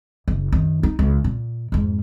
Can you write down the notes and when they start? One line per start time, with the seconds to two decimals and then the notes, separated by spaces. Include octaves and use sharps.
0.28 F#1
0.52 F#2 D#3
0.83 D#4
0.99 C#2
1.24 A#2
1.72 F2 G#2